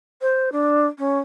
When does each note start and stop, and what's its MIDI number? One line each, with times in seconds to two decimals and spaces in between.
0.22 0.52 72
0.52 0.86 62
0.98 1.19 61